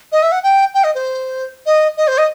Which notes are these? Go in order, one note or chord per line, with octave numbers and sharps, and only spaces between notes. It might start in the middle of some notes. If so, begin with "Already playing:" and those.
D#5
E5
F#5
G5
G5
D#5
C5
D#5
D#5
C5
D#5